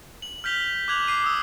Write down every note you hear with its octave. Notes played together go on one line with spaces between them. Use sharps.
F#7
F6 G6 B6 F7 G7
D6 F#6 G#6 F7 F#7
D6 C7 D#7
D#6 E6